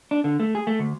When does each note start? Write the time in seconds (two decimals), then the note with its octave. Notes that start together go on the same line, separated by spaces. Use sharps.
0.11 D4
0.24 D3
0.40 A3
0.55 G#4
0.67 A3
0.79 D2